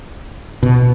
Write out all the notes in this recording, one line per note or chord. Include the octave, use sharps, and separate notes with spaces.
B2